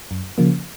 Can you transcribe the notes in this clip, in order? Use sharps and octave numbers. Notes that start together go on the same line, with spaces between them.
F#2
C#3 F3 A#3